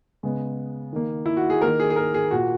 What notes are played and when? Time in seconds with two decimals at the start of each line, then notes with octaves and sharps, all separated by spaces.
0.23 C#3 G#3 B3
0.93 D#3 A#3
1.26 E4
1.37 F#4
1.50 G#4
1.62 D#3 A#3 A#4
1.80 G#4
1.90 G#4
1.96 A#4
2.14 G#4
2.31 A#2 A#3 F#4